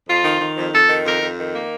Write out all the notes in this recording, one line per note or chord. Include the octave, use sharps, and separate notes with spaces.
F2 F4
D#3
D#3
F2
F2 A4
D#3
F2 A#4
F2
D#3
A#3